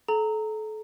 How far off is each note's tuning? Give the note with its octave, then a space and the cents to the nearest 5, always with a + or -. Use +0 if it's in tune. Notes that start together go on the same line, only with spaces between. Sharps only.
A4 -30 A#5 -15